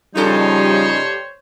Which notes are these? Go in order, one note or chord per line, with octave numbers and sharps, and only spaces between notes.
G2 C#3 F3 G3 D#4 A4 C5 C#5